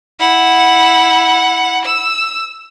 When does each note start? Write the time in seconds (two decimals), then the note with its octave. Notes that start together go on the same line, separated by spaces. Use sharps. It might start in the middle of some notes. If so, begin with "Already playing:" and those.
0.20 E4 F#5
1.85 E6